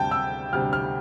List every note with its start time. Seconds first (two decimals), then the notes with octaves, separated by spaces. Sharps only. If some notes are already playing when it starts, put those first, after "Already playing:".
Already playing: D2 C3 G3 G5 A5
0.11 E6
0.53 D2 C3 G3 F6
0.73 F6